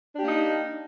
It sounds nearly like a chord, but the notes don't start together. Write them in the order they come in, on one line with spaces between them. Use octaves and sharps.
D4 G4 A#3 D#4